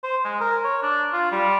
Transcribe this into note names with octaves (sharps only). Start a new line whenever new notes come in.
C5
G#3
A#4
C#5
D4
F4
G3